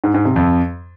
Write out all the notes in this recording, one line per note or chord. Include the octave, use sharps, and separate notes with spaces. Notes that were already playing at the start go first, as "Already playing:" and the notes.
G#2
G#2
C3
F2